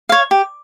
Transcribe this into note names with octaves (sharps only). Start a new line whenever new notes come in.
C#5 F5
G4